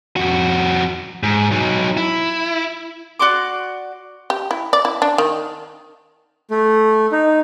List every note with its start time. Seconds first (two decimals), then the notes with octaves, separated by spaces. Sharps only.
0.16 F2 F#4
1.23 G#2
1.52 F#3 D#4
1.97 E4
3.20 F#4 D5 C6 D6
4.30 G4
4.51 E4
4.73 D5
4.85 E4
5.02 D4
5.18 D#3
6.51 A3
7.12 D#4